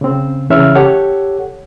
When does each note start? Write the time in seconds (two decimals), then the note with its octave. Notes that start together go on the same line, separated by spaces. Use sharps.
0.01 C#3 C4
0.50 C#3 E3 C#4 C#5 E5 F6
0.75 G4 A4 C#5 F#5